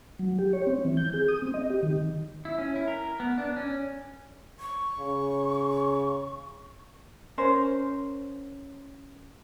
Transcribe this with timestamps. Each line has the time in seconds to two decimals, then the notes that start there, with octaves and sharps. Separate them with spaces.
0.19 F#3
0.39 G4
0.53 C#5
0.67 C4
0.85 E3
0.97 G6
1.13 G#4
1.28 D#6
1.42 C4
1.54 D#5
1.70 G4
1.83 D#3
2.45 E4
2.58 C#4
2.76 E4
2.88 A#4
3.20 B3
3.38 D4
3.56 C#4
4.60 C#6
5.00 C#3
7.38 C#4 A#4 C5